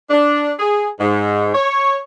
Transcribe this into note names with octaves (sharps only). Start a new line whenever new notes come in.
D4
G#4
G#2
C#5